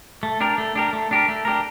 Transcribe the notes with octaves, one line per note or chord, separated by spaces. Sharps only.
A3
D4 G4 A#4
A3
D4 G4 A#4
A3
D4 G4 A#4
A3
D4 G4 A#4